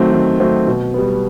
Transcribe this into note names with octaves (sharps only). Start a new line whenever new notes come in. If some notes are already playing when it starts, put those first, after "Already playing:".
Already playing: D#3 F#3 A3 C4
D#3
F#3 A3 C4
B2
G3 B3